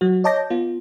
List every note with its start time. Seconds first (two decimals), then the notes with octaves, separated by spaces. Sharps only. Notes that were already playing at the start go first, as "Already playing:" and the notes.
0.01 F#3 F#4
0.24 C#5 D#5 A5 D6 G6 A#6
0.50 B3 F4